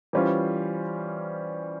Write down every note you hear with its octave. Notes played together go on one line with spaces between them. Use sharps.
E3 G3 C#4 F4 C5